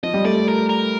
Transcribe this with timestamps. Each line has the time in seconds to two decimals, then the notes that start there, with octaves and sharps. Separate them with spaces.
0.03 F3 D#5
0.14 G3
0.25 A3 D5
0.48 A#4
0.69 A#4